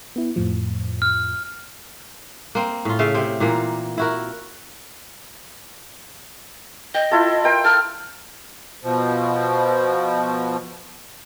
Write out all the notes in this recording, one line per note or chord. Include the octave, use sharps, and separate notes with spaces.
B3 E4
F2 A2 F3
F6
A#3 C4
A2 F4
C#3 E5 F5
C3 C4
A#2 E3 A#3
E4 F#4 A#4
D#5 G5
E4 F4 A4
A#4 G5 C6
A4 F6
B2 F3